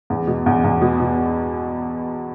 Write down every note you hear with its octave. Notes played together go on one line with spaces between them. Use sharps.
E2
B2
E2
E2
B2
B2